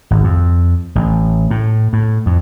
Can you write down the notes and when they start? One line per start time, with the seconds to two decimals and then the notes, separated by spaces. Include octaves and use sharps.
0.11 G#1
0.24 F2
0.95 A1
1.51 A2
1.93 A2
2.26 F2